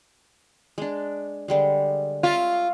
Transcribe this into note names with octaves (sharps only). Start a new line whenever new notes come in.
G#3 D4
D3 G3 G#3
F4 C#5 E5